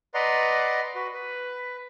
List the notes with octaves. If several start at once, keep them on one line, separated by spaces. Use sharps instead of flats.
B4 D5 D#5 F#5 A#5 C6
F#4 B4
B4